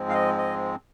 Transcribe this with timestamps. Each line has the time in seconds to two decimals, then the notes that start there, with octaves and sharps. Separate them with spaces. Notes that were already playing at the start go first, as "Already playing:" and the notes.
Already playing: G#2 F3 G#3 C4
0.09 F5
0.14 D#5
0.38 D#5